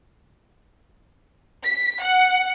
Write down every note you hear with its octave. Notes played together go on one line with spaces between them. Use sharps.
B6
F#5